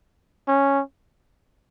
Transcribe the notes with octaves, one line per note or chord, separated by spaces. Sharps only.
C#4